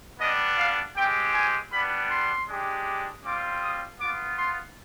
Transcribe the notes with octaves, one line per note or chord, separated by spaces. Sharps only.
G3 B3 D4 D#5
F5
G#3 C4 G4 G5
G#5
G3 B3 D4 B5
C6
G#3 D4 G4
G3 C4 F4 D6
D#6
B3 F4 D6
C6